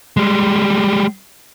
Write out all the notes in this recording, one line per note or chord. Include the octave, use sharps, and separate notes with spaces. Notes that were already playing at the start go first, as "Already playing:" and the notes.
G3 G#3